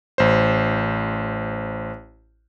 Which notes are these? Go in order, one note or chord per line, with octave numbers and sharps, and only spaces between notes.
A1 C5